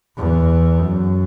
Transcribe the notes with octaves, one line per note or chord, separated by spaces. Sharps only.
E2
F#2